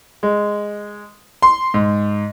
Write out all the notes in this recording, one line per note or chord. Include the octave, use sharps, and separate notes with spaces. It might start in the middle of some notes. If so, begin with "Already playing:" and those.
G#3
C6
G#2